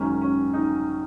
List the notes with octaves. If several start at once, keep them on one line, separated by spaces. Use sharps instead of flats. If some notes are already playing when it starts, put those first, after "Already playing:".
Already playing: G#1 F#2 D#3 C#4
C#4
D#4